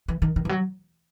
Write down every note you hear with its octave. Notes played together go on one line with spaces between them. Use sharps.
E3
D#3
D#3
E3
F#3